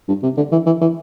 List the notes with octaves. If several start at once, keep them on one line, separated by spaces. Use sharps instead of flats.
G2
C3
D3
E3
E3
E3